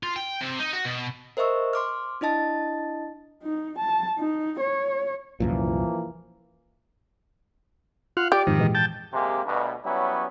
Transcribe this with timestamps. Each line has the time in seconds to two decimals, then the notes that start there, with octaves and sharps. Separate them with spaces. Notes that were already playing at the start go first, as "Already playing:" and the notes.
0.03 F4
0.16 G5
0.41 C3
0.59 D#4
0.73 F#4
0.85 B2
1.37 A#4 C5 D#5 E5 C#6 E6
1.73 C6 D6 F6
2.21 D4 E4 D#5 A5 A6
3.43 D#4
3.79 A5
4.19 D#4
4.60 C#5
5.40 C2 F#2 A#2 E3 F3 A#3
8.17 F4 F5 F#5
8.32 G4 D5
8.47 F2 G#2 D#3 F3
8.58 A#2 E3 G#3
8.75 G5 A5
9.13 C3 G#3 A#3 G4
9.45 D2 G2 B2
9.84 F#3 G3 B3 C#4 E4